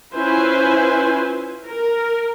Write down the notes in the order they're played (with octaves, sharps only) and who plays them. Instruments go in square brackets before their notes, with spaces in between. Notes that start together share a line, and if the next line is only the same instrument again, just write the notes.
[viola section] C#4 E4 F4 B4 C5 G#5
A#4